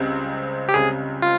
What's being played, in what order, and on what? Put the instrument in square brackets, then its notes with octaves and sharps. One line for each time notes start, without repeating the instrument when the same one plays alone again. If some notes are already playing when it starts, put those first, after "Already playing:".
Already playing: [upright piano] C#2 C#3 G3 C4
[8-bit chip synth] G4
[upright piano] C#2 C#3 G3 C4 [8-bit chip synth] G#4
[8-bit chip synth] F4